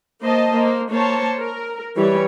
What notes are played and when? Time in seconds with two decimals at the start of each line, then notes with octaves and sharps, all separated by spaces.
0.22 A#3 C5 D#5 A5
0.53 A#3 C5
0.91 A#3 C5 C#5 A5
1.39 A#4
1.96 E3 G3 G4 C#5